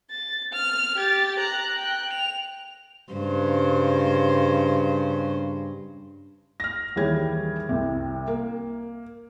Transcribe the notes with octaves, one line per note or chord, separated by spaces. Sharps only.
A6
F6
G4 A6
A#5 F#6
G5 F#6
F7
G2 C#3 C5
F6 A#6
D#2 E3 G3 G#4 C#5 G#6
C2 C3
A#3